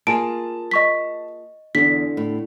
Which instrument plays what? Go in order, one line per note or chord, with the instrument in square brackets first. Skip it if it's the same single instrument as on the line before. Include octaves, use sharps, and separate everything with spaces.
[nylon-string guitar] A#3 F4 G#4 [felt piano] A5 [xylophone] D7
[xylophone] D#5 C#6 B6
[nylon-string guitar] E2 [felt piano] D3 [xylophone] B6
[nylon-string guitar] A2